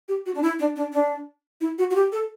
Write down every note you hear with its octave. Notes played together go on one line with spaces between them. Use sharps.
G4
F#4
D4
E4
D4
D4
D4
E4
F#4
F#4
G4
A4